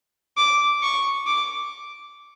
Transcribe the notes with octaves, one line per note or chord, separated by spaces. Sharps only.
D6
C#6
D6